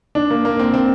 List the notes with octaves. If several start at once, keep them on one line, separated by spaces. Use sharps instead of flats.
D4
A#3
A#3
C4
C4